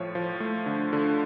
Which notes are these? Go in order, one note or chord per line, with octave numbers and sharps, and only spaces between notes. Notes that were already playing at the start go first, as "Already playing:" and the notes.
Already playing: A2 F3 C#5
F3
A3
D3
D3